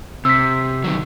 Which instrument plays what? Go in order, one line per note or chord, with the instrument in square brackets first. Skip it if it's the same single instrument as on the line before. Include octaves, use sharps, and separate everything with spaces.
[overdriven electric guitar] C3 [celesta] E6 B6
[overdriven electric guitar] D#3 F#3